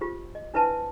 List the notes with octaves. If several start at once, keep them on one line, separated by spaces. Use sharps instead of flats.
F4 G4 C5
D#5
D4 E4 B4 C5 E5 A5